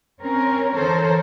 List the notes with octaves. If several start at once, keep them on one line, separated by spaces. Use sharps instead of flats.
C4 C#4 A#4
D3 E3 A4 A#4 C5 C#5